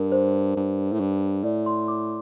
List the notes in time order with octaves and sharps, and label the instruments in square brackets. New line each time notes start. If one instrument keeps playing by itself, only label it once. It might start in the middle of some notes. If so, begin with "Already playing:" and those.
Already playing: [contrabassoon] G2 [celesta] A#4
[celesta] C5
[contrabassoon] G2
A2
G2
[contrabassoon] A2 [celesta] D5
[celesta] C6
D6